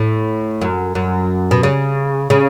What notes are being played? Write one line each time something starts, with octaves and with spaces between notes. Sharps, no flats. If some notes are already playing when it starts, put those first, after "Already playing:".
Already playing: A2
F#2
F#2
B2
C#3
C#3